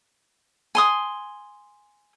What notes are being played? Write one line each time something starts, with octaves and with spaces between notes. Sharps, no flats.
G#5 C6 D#6